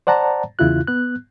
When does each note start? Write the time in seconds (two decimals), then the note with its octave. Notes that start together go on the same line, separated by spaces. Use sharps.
0.07 C5 D5 F#5 A5 A#5
0.59 E2 C#3 E4 F4 F#6
0.88 B3 F#6